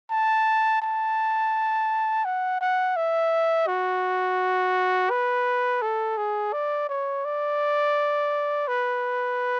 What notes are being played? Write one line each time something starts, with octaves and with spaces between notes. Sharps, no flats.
A5
A5
F#5
F#5
E5
F#4
B4
A4
G#4
D5
C#5
D5
B4